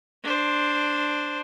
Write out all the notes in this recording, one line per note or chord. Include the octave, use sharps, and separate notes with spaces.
D4 C5